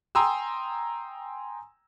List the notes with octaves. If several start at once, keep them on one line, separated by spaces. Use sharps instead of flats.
G5 G#5 A#5 C6 D#6 E6